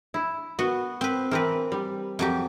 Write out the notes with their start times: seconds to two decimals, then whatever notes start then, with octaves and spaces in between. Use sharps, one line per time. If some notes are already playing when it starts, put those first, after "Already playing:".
0.14 E4
0.59 B3 F#4
1.01 C4 B4
1.31 E3 C4 A#4 B4
1.72 G3
2.19 F2 F#3 G4